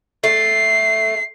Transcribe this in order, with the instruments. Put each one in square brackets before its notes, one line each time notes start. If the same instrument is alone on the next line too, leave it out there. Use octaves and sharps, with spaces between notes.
[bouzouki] A3 [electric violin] C7